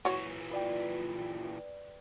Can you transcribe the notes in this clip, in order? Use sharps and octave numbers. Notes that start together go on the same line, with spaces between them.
A#2 E3 F#4 C#5
F4 B4 D5 G5